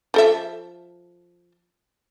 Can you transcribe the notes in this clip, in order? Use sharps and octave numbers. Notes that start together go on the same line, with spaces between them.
F3 A4 E5